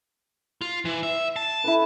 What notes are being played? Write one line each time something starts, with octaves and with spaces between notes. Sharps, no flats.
F4
E3
E5
A5
E4 A4 B4